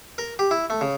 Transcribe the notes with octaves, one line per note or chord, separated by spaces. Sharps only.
A#4
G4
E4
A3
C#3